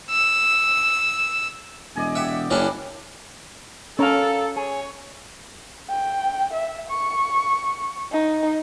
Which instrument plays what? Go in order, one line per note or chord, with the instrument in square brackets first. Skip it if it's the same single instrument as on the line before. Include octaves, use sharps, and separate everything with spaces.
[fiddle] E6
[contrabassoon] E1 [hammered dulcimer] D5 D#5 G#5
[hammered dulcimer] G4 F#5 [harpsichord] E5
[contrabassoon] F#1 [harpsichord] E3 C#4 D4 [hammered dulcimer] G3
[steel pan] C#4 [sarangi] A4 [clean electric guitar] A#4 F5
[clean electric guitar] G#4 [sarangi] C#5
[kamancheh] G5
E5
C#6
D#4